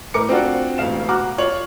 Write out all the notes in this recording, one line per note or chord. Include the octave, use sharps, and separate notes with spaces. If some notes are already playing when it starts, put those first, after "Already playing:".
A2 A#4 D6 C#7
C4 D4 F4 F#4
E1 A2 F5 E7
F#4 A#5 D6 F6
F4 C#5 F#7